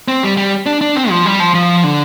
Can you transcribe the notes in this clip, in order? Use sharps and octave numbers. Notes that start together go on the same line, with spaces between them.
C4
G3
G3
D4
D4
C4
F3
G3
F3
F3
D3